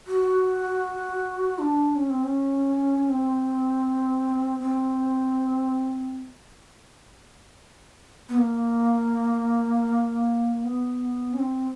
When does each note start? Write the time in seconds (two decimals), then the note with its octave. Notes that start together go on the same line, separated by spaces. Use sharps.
0.07 F#4
1.59 D4
1.96 C#4
2.10 C4
2.24 C#4
3.10 C4
4.60 C4
8.29 B3
8.38 A#3
10.65 B3
11.33 C#4
11.39 C4